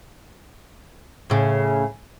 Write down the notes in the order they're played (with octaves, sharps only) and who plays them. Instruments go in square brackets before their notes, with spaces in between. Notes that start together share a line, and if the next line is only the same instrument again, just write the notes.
[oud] A2 C#3